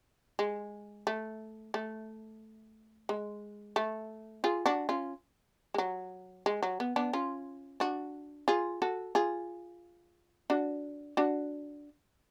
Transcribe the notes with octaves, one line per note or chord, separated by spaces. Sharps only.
G#3
A3
A3
G#3
A3
F4 G#4
D4 F#4
C#4 F4
G#3
F#3
G#3
F#3
B3
B3 D4
C#4 F4
D4 F#4
F4 G#4
F#4 A4
F4 G#4
D4 F#4
D4 F#4